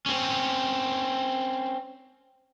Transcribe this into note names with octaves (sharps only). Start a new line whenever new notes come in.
C4 C#4